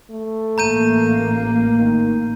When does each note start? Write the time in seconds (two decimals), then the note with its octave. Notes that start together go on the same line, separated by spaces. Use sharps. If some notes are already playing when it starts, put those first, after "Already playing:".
0.11 A3
0.58 A1 A#3 A#5 G6 D#7
1.79 D#3